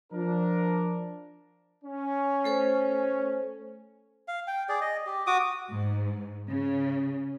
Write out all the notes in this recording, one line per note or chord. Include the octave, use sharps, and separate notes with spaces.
F3 D4 A#4
C#4
A3 A4 C5
F5
G5
G#4 D5
D#5
G4
F#4 D6 D#6
G#2
C#3